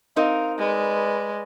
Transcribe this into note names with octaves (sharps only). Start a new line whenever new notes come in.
C4 D#4 A#4 F5
G#3 B4 D5